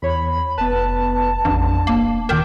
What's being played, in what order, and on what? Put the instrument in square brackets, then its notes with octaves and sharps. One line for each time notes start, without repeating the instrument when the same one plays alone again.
[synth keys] E2 C#5 [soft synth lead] B5
[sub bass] F1 [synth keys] B3 B4 [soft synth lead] A5
[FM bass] A1 [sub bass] F2 [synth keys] D4
[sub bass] D#1 [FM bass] A#3
[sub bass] D2 [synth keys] A#2 G5 G6 [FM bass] D#3 [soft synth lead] D6